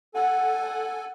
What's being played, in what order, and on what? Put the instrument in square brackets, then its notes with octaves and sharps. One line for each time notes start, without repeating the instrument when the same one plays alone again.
[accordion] A4 G#5 [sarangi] F#5